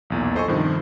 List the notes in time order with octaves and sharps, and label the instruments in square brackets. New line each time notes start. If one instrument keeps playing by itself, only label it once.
[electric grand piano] B1 E2 A#2
A4 C5 D#5 G#5 C#6
G2 C3 D#3 F3